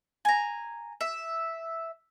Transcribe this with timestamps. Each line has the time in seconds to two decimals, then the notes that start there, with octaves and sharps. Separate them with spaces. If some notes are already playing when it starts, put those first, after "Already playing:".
0.25 G#5 A#5
1.01 E5